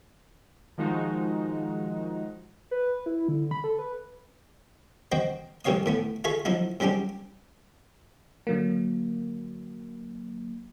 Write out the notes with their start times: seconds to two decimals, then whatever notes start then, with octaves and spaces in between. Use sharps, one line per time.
0.78 D#3 F3 G#3 D#4 F#4
2.71 B4
3.06 E4
3.28 D3
3.51 B5
3.64 A4
3.79 B4
5.12 F#4 C5 D#5 G5
5.65 A1 G2 G4 C#5 F5 D#6
5.86 A2 A3 B3
6.24 F4 G#4 A4 E5 G#5 C#6
6.45 F3 F#3 D#4 E4
6.80 G#2 F#3 G3 C#4 D4 G4
8.47 D3 F#3 A#3